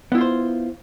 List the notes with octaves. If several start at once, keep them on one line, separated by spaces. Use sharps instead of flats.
B3 E4 F4 C5